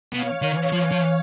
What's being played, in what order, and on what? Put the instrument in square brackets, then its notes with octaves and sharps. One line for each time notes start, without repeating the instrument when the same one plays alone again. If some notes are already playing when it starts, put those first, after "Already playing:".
[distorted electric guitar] B2 [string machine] C#5 F5
[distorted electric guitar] D#3
F3
F3